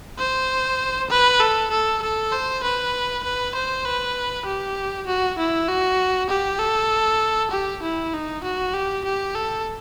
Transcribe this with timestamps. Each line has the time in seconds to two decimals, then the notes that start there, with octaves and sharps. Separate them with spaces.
0.19 C5
1.10 B4
1.40 A4
1.71 A4
2.02 A4
2.32 C5
2.63 B4
3.23 B4
3.55 C5
3.85 B4
4.46 G4
5.07 F#4
5.38 E4
5.68 F#4
6.30 G4
6.60 A4
7.51 G4
7.83 E4
8.13 D#4
8.44 F#4
8.74 G4
9.05 G4
9.35 A4